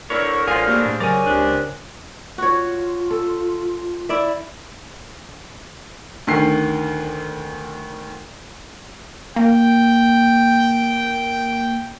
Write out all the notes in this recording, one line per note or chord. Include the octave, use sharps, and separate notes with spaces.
D3 E4 A#4 B4 C#5
A1 F4 G#4 C5 F5
A3 A#3 D4 E4 G4 G#4
A2
C#3 F#3 A#4 D5 G#5
C#2 C3 D4
F4 F#4 C#5
A4
E4 D5 E5
D2 D#3 C7
A#3 G5